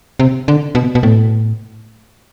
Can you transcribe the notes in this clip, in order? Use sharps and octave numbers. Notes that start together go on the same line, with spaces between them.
C3
D3
B2
B2
A2